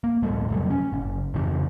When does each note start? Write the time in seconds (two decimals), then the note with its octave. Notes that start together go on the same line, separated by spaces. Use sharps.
0.04 A#3
0.22 D1 G3 A3
0.50 F2 C3 F#3 G3
0.70 C#4
0.93 F#1
1.34 F2 C#3 E3